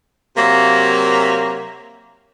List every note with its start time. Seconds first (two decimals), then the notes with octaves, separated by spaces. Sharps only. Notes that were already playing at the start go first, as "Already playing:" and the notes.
0.37 C3 F#3 A#3